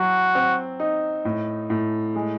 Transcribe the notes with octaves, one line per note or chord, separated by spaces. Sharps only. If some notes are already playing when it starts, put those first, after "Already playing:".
Already playing: F#3 E4 F#4
C4
D#4
A2
A2
G#3